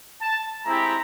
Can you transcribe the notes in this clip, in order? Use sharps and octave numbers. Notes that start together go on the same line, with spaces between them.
A5
G#3 C4 E4 G4 A#5